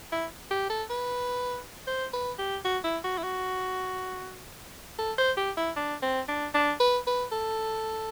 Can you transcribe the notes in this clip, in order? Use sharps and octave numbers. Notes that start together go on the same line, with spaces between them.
E4
G4
A4
B4
C5
B4
G4
F#4
E4
F#4
E4
F#4
A4
C5
G4
E4
D4
C4
D4
D4
B4
B4
A4